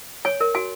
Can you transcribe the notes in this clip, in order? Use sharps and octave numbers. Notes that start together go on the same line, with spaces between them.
C#5 G#5
A#4
F#4 G#5